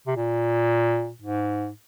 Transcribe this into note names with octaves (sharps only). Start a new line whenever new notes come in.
C3
A#2
G#2